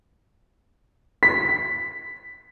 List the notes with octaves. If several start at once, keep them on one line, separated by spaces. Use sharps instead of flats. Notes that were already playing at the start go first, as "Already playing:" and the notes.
B6